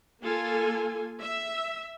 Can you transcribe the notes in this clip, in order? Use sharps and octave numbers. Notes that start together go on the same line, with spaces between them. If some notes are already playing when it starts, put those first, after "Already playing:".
A#3 F4 A4 G#5
E5